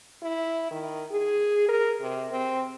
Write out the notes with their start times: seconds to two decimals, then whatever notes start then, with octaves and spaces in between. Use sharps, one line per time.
0.22 E4
0.71 D#3
1.11 G#4
1.68 A#4
2.01 C3
2.30 C4